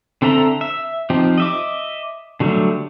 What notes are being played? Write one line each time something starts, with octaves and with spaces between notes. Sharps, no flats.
D3 C4 A4 E5 A#5
E5
F3 C4 D#4 G4
D#5 E5 D6
D3 F#3 G3 A3